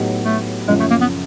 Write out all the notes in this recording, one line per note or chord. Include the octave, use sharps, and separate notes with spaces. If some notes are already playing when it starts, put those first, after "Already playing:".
Already playing: A2 F#3 B3 D#4 G4
A3
F#2 C#3 F3 G#3
A3
A#3
B3